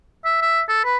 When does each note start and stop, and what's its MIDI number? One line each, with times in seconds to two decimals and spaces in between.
0.25 0.37 76
0.42 0.61 76
0.69 0.81 69
0.85 0.97 71